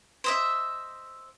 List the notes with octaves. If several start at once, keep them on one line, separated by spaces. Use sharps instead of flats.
C5 D#5 E5